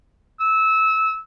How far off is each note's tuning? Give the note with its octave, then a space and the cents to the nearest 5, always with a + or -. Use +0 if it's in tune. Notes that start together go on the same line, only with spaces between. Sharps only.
E6 -20